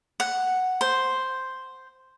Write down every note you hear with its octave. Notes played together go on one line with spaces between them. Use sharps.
F#5
C5